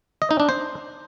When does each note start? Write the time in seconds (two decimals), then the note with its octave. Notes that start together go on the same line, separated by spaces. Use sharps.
0.22 D#5
0.31 D#4
0.40 D4
0.49 C5